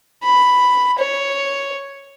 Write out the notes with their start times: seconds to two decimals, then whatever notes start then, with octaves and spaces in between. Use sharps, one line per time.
0.23 B5
0.99 C#5